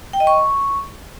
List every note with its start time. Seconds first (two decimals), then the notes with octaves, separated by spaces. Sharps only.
0.13 G5
0.20 D#5
0.27 C#6